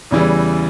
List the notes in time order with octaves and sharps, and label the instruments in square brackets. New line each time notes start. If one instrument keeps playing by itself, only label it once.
[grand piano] E2 C#3 E3 G3